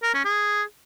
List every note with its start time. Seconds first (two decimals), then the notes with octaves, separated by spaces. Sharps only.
0.03 A#4
0.14 C#4
0.25 G#4